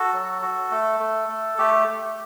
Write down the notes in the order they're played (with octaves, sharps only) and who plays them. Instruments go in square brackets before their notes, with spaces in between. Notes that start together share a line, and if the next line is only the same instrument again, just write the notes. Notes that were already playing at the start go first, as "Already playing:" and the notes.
Already playing: [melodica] F#4 A4
F#3
F#4
A3
A3
A3
A3 G4
A3